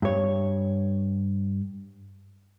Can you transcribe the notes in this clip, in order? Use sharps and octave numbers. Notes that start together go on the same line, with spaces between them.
G2 C#5